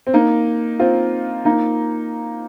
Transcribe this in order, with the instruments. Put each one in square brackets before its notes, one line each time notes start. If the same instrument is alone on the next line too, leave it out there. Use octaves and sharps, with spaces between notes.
[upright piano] C4
A#3 D#4
C4 F4
A#3 D#4